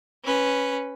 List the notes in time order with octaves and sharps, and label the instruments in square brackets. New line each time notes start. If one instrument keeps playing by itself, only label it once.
[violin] C#4 B4